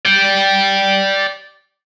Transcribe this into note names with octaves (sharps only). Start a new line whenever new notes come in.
D5 G5